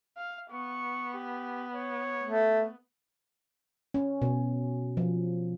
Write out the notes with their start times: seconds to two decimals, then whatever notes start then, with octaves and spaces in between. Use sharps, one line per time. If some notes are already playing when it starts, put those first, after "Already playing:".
0.17 F5
0.51 B3 C#6
1.14 G4
1.75 C#5
2.23 A3
3.94 C#4
4.22 B2
4.97 F3